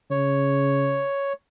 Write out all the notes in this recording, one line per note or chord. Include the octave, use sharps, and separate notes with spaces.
C#3 C#5